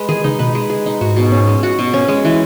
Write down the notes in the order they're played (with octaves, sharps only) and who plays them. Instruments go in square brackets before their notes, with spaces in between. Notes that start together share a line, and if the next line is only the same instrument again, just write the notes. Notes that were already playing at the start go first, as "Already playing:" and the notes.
Already playing: [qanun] G#3 B4
[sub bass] D#3 [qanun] G#4
[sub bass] C#3 [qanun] D#4
[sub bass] B2 [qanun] B4
[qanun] G#3
G#4
D#4
[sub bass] G#2 [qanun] F#4
[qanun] B2
C#4
G#3
F#4
B2
C#4
G#3
E3